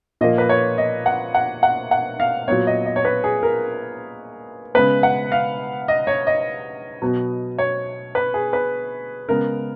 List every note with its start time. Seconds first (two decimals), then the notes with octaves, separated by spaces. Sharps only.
0.21 A#2 F3 A#3 D#5
0.38 B4
0.49 C#5
0.78 D#5
1.06 F#5
1.34 F#5
1.63 F#5
1.91 F#5
2.20 F5
2.48 A#2 F#3 B3 C#5
2.67 D#5
2.86 D#5
2.96 C#5
3.05 B4
3.24 G#4
3.43 A#4
4.75 C#3 G#3 B3 B4
5.03 F#5
5.32 F5
5.88 D#5
6.07 C#5
6.27 D#5
7.02 B2 F#3 B3
7.58 C#5
8.15 B4
8.34 G#4
8.53 B4
9.29 C#3 G#3 B3 A#4